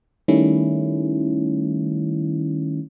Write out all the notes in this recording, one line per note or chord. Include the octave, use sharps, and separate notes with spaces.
D#3 G3 A3 C#4 E4